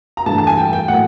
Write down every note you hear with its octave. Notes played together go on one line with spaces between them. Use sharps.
A#5
G2 E3 A3 A5
A5
G#5
G5
G5
A2 F#3 A#3 F#5